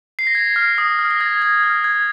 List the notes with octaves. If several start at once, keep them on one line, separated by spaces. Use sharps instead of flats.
C7
A#6
G#6
F6
D#6
F6
A#6
G#6
G#6
F6
G#6